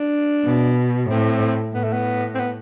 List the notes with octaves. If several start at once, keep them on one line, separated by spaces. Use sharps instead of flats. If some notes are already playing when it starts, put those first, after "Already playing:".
Already playing: D4
B2
A2 C4
A2 B3
A3
B3
C4
B3